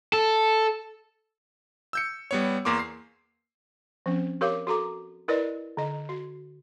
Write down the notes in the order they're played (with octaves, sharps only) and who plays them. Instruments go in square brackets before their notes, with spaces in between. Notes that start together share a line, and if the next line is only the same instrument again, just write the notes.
[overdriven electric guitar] A4
[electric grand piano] E6 G6 C#7
G3 B3 C#5
E2 A#3 C6 D6
C7
[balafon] F3 C4 C#4
G4 A#4 C#5 F5 D6
F#4 A4 A#5 D6
E4 A#4 B4 D5 D#5
D3 D#5
F#4